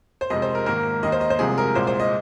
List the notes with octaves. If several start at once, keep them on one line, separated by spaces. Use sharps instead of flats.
C5
F2 C3 G#3 D#5
C5
A#4
G#2 D#3 A#3 A#4
D#2 D#3 A#3 D#5
C5
D#5
C5
C2 C3 F3 G#3 G#4
A#4
C2 A#2 G#3 C5
C5
D#5